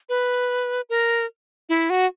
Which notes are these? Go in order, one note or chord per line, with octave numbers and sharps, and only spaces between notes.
B4
A#4
E4
F#4